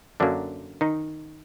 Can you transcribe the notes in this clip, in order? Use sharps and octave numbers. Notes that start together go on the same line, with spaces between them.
F#2 D3 F#3 A#3 D4
D#3 D#4